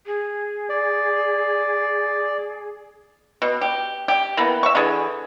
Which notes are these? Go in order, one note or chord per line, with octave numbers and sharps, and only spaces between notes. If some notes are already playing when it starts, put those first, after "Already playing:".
G#4
D5
B2
G4
G4
E3 A#3 B3
E5 C#6
D3 E3 G#4